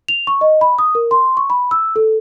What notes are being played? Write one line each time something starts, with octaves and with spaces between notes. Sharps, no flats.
F7
C#6
D#5
B5
D#6
A#4
C6
C#6
B5
E6
A4